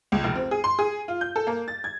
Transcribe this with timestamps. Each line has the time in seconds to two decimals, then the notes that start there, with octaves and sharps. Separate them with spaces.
0.12 C#2
0.24 F1
0.35 C4
0.51 G#4
0.64 C6
0.79 G#4
1.08 F4
1.21 G6
1.36 A4
1.47 A#3
1.68 A6
1.84 G#6